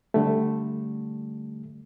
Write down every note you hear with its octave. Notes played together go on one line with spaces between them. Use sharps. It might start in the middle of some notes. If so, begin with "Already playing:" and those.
D3 G3 A3